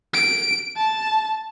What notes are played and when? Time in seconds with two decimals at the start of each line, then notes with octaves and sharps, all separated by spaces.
0.14 D7
0.77 A5